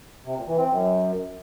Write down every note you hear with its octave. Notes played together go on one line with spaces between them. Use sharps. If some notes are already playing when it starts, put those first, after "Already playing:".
C3
A#2
E3
C4
F#2